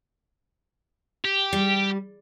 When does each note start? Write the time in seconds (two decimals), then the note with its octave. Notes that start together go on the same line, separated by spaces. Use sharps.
1.25 G4
1.53 G3